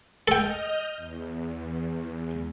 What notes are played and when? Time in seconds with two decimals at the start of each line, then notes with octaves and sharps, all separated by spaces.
0.28 A4 D#5 G5 F6 G6
0.97 E2